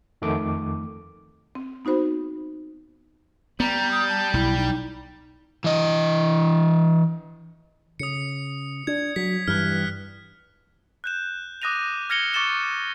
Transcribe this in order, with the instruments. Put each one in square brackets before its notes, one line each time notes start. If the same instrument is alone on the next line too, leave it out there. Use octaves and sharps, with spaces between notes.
[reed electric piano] F2 D#3 A3 D6
[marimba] C4
B3 D#4 F#4 C5 B5
[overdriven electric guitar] G3 [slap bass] B3 [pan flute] A#5
[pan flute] D#6
A5
[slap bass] B1 [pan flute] E4
[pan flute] D#4
[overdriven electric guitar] E3 D#5
[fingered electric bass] C#3 [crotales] D#6 C#7
[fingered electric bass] D4 [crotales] G#6
[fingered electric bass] F#3 [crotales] B6
[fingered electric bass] G2 E3 G3 [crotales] F6 F#6
[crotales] F#6 G6 E7
D6 D#6 F#6 A#6 D#7 F7
F6 G#6 A#6 C#7 F7 G7
C#6 D6 A6 C#7 E7 G7